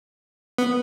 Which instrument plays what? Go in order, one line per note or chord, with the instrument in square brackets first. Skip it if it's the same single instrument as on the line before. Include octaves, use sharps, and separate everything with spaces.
[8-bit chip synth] B3